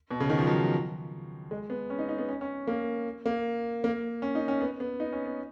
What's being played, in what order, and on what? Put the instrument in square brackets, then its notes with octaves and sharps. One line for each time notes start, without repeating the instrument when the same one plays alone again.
[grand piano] B2
C#3
D#3
F3
F#3
G#3
B3
C#4
D#4
D#4
B3
C#4
C#4
A#3
A#3
A#3
C#4
D#4
C#4
B3
B3
D#4
C#4
B3